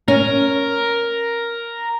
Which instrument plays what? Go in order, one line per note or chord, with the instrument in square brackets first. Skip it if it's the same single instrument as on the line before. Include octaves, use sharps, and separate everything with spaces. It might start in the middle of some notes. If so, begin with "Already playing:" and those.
[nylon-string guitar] C#4 [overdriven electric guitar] A#4